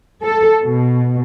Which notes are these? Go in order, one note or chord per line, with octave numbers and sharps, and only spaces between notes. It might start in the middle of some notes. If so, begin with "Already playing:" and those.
A4
B2